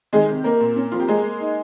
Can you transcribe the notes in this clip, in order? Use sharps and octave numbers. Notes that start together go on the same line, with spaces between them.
D#3 G#3 G#4
C3
A#3 A#4
A#2
C#4
F2 F4
G4
G#3 A#3 G#4
A#3
D#4